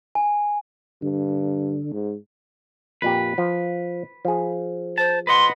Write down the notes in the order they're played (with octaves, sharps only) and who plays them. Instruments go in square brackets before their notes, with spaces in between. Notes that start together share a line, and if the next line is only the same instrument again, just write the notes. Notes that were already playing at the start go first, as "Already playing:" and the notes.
[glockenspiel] G#5
[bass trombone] G2 [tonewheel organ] D3
[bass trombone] G#2
[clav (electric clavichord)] F2 A#2 G4 [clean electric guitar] B4
[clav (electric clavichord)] F3
F3 G#4
[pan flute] C5 [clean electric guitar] A5
[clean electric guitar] B4 D#5 F#5 [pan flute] C6